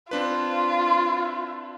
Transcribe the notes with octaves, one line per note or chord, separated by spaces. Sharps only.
C4 D4 F4 B4